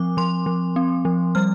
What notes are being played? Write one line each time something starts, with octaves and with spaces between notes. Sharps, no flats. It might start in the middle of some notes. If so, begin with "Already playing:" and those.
Already playing: F3 C4 D6
F3 C6
F3
C4
F3
G3 F6